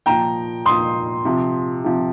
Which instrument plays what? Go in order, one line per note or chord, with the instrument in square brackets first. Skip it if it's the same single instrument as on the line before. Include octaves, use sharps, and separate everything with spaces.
[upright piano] A#2 F3 G5 A#5
A#2 F3 C6 D#6
C3 F3
C3 F3